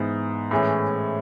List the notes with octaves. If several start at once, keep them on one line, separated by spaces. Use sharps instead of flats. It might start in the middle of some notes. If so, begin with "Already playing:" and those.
Already playing: G#2 E3 B3
A2 E3 G#3 C#4